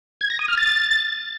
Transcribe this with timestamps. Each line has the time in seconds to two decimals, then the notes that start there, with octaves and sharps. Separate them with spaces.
0.21 G#6
0.30 A#6
0.39 D#6
0.48 F6
0.57 A6